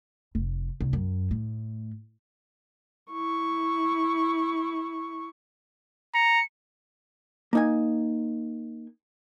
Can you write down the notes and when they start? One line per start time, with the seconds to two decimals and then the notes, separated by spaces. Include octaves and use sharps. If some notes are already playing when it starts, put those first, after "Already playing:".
0.35 F1
0.81 C2
0.93 F#2
1.31 A2
3.12 E4 C#6
6.15 A#5 C#7
7.53 A#3 D#4 G#5